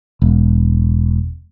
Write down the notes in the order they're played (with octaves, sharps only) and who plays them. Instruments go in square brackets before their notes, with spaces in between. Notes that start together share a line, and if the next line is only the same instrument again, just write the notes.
[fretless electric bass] E1